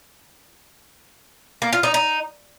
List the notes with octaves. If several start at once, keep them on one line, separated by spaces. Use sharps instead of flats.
A#3
F4
D#4
D#4